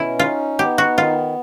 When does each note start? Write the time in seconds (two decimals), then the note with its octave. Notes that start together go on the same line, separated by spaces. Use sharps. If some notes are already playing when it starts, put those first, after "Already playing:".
Already playing: B2 C#4 E4
0.19 D#4 F4
0.59 B3 G4
0.78 F#4
0.98 D#3 F4